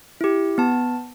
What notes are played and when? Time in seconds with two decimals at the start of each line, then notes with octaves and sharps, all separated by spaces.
0.21 E4 G4
0.58 B3 A5